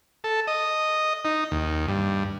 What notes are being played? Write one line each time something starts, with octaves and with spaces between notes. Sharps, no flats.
A4
D#5
D#4
D#2
G2